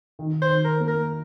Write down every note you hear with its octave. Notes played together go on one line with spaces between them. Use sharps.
D#3
C5
D#3
A#4
A#3
A#4